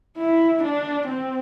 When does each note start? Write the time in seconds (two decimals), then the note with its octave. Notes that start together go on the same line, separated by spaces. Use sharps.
0.17 E4
0.63 D4
1.09 C4